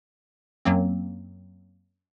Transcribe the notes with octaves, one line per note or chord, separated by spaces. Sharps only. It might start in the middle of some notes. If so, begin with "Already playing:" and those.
F#2 F#3 A#3 C4